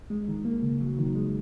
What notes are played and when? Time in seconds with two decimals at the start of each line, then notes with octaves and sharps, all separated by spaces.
0.10 G#3
0.28 D#3
0.45 A#3
0.63 C#3
0.81 F#3
0.99 D#3
1.15 G#3